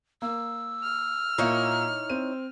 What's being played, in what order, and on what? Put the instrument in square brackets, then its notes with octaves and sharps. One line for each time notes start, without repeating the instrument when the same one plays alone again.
[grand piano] A#3 [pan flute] E6
[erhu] F6
[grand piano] A#2 A#3 [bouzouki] D#4 E4 C#5
[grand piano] C4 D#7